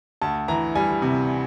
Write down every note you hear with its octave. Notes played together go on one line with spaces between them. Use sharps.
D2 A5
E3 A#5
G3 G#5
C3